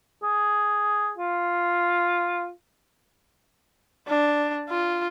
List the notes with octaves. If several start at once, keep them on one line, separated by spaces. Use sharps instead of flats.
G#4
F4
D4
F4